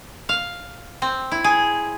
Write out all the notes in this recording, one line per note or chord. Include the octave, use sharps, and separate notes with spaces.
F5
C4
E4
G#4